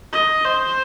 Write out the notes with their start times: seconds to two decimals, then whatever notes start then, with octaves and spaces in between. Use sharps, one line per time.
0.12 D#5
0.45 C5